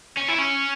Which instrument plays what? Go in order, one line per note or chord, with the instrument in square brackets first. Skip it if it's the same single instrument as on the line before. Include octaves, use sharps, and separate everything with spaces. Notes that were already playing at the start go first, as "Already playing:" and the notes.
[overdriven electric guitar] C#4
E4
C#4